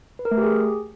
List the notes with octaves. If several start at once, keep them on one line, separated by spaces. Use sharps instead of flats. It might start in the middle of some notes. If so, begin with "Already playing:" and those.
B4
A#4
A3
G4
G#4